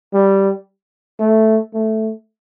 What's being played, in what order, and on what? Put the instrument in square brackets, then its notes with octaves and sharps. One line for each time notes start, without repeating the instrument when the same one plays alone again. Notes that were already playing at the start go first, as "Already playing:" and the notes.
[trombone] G3
A3
A3